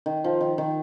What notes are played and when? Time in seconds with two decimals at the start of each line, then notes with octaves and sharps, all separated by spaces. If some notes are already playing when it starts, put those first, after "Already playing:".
0.06 D#3
0.24 F3
0.41 D#3
0.58 D#3